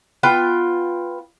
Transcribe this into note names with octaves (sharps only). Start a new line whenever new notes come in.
B3 F4 G5